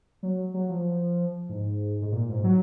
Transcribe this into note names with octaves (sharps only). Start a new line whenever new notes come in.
F#3
F#3
F3
G#2
G#2
A#2
G#2
F#3